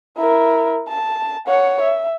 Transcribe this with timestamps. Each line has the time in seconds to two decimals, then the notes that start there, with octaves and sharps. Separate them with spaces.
0.17 E4 A#4
0.88 A5
1.47 C#5 F#5
1.82 E5